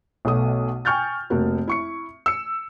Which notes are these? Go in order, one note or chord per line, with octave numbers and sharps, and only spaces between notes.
B1 B2 A3 D#6
G5 G#5 C#6 F6 G6 A6
F1 A#3 F#4
E4 C#6 C#7
E6 C#7